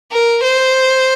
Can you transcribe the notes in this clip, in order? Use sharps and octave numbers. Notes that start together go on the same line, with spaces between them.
A#4
C5